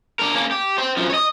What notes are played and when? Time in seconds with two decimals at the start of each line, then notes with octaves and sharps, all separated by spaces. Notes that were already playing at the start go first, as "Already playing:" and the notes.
0.19 D4 A#4
0.34 A#3 C#4
0.51 G4
0.78 C5 G5
0.97 F#2 F3
1.10 C#5 D#5